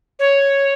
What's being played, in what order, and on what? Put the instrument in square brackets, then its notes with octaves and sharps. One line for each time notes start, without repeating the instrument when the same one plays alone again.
[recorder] C#5